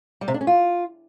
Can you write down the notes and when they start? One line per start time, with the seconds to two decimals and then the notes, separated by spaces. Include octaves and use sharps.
0.21 G3
0.28 C3
0.34 D4
0.41 C#4
0.47 F4